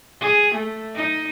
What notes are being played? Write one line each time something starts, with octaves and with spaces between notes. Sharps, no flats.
G#4
A3
D#4